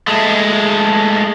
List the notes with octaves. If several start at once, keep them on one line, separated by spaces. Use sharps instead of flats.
G#3 A3